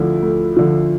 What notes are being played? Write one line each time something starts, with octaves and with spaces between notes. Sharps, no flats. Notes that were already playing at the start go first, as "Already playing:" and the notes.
Already playing: D2 D3 F3 E4
D2
D3 F3